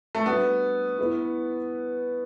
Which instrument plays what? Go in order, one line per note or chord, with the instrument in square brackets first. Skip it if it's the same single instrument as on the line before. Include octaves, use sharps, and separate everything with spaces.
[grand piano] A3
[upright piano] G3 D4 F#4 A4 [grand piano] B3
[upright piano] B3 E4 B4